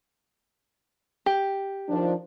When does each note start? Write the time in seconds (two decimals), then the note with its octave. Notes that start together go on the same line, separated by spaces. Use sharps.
1.26 G4
1.89 D#3 F3 D4